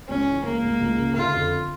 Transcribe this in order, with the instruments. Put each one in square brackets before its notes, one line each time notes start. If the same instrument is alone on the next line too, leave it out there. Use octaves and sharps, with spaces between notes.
[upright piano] C#2 [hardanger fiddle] C#4
[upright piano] E3
[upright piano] C#2 [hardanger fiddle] A#3
[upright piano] C#2
C#2
C#3
[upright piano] D3 [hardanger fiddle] F4
[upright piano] F2